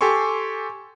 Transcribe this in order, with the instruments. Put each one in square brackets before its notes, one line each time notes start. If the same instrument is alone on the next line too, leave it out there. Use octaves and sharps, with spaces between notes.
[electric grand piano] G4 A4 G#5 C6 C#6